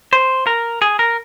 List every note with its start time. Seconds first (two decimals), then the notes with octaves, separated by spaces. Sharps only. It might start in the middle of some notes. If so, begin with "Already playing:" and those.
0.13 C5
0.47 A#4
0.82 G#4
0.99 A#4